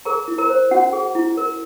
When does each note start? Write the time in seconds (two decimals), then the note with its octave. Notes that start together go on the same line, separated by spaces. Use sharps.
0.05 G#4 A#4 A#5
0.28 E4
0.38 A#4 A#5
0.49 C5
0.71 C#4 F#4 F#5
0.93 G#4
1.15 E4
1.37 A#4